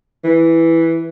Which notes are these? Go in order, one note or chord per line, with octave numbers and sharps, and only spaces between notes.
E3